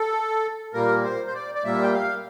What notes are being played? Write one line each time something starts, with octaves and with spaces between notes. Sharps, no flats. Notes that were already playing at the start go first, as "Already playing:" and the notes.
Already playing: A4
A#2 G3 A#3 A#4
C5
C5
D5
D5
A#2 G3 A#3 E5
G5
F5